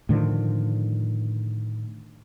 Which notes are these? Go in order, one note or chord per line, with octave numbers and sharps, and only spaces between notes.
A2 D3 D#3 F3